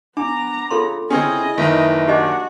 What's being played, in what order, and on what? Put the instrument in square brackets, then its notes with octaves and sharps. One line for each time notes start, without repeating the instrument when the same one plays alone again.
[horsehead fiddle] B3 A#5 [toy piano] D4 [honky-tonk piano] D6
[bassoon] C#3 [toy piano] F4 A4 C6
[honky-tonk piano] C#3 C4 C#4 [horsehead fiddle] E4 D#5 [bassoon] G#4
[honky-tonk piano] F#1 D#3 D#4 [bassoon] E3
[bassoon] D4 [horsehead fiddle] F#4 [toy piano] G4 D#5 G#5